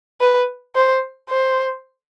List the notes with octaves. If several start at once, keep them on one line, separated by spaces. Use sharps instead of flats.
B4
C5
C5